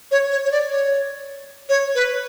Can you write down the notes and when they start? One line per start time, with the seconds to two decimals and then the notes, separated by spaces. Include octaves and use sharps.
0.11 C#5
0.31 C#5
0.45 C#5
0.52 D5
0.70 C#5
1.69 C#5
1.95 B4